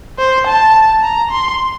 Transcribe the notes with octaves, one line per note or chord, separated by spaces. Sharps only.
C5
A5
A#5
C6